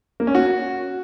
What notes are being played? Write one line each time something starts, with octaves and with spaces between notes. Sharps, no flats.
A#3
C#4
F#4